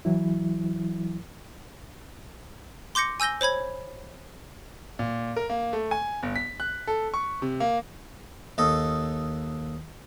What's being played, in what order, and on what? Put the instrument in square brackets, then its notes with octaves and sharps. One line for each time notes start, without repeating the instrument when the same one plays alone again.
[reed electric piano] E3 F#3 E4
[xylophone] C6 D6 G6 A#6 C#7
G#5 E6 G6 A#6 G7
C5 C#5 B5 G#6
[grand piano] A#2
A#4
A#3
A3
G#5
G1
B6
F#6
A4
C#6
C3
A#3
[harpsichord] D#2 A4 D#5